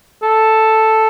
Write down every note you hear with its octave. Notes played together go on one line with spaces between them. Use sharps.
A4